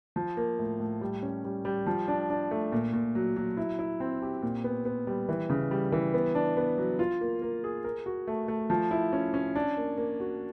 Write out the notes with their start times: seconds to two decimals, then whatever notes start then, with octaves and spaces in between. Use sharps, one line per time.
0.16 F3
0.37 A#3
0.59 A2
0.80 A2
1.01 G3
1.22 C#4
1.45 G3
1.65 G3
1.86 F3
2.08 D4
2.30 D4
2.51 A3
2.72 A#2
2.94 A#2
3.15 F#3
3.36 F#3
3.57 E4
3.79 E4
4.00 C4
4.22 G4
4.42 A#2
4.64 B3
4.85 B3
5.07 G3
5.29 E3
5.50 C#3
5.71 G3
5.92 E3
6.14 B3
6.35 D4
6.57 B3
6.78 F#3
6.99 F4
7.21 A#3
7.42 A#3
7.64 G#4
7.84 A#4
8.06 F#4
8.27 A3
8.48 A3
8.70 F3
8.91 E4
9.13 C#4
9.34 C#4
9.55 D4
9.77 A#3
9.98 A#3
10.20 F#4